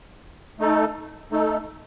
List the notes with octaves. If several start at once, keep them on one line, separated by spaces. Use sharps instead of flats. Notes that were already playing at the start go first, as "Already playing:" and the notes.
A3 D#4 A4
A3 D#4 A4